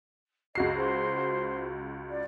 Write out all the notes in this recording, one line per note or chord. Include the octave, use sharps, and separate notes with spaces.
C#2 F#4 D#5 C7
C5
D5